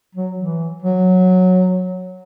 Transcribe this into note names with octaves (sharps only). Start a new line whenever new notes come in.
F#3
E3
F#3